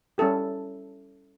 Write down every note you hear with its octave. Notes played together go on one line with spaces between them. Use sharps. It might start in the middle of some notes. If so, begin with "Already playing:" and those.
G3 C#4 E4 G4 A4